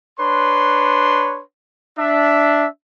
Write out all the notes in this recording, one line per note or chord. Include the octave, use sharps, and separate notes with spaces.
D4 B4 C#5 C6
D4 E5